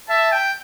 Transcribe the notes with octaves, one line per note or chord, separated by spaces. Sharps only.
E5 A5
G5